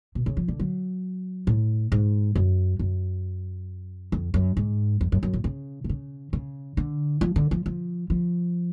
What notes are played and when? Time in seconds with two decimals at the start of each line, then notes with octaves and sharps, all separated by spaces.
0.15 B2
0.26 C#3
0.37 F3
0.48 D3
0.60 F#3
1.47 A2
1.92 G#2
2.36 F#2
2.79 F#2
4.12 F2
4.34 F#2
4.57 G#2
5.01 F2
5.12 F#2
5.23 F#2
5.33 A2
5.44 C#3
5.84 B2
5.89 C#3
6.33 C#3
6.77 D3
7.21 F3
7.36 D3
7.51 F3
7.66 F3
8.10 F3